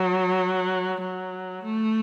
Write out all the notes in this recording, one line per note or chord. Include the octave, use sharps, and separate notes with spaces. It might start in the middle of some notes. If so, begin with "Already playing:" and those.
Already playing: F#3
F#3
A3